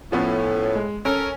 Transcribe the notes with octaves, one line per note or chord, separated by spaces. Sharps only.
A2 F3 B3 C#4
G#3
C#4 A4 A#4